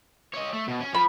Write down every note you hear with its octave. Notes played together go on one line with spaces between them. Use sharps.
C#5 D#5
A3
B2
C#4
F3 B5